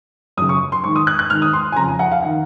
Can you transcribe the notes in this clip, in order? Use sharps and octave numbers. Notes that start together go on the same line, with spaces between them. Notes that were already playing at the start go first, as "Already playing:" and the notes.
F#2 C#3 D#6
C#6
C6
G#2 D#3 C#6
D#6
F#6
F#6
G#2 D#3 F6
D#6
C6
G#5
F2 C#3 A#5
G#5
F#5
F5
D#3 F#5